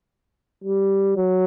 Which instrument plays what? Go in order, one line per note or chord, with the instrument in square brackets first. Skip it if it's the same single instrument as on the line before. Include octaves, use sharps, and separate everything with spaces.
[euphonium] G3
F#3